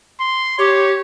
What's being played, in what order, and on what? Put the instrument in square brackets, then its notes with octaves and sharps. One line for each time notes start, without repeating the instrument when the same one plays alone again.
[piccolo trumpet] C6
[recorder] G4 [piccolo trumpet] C#5